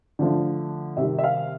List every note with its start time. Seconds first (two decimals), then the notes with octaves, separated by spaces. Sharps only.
0.19 D3 F3 A3 D4 F4
0.97 C3 D#3 G3 E5
1.18 E5
1.24 F5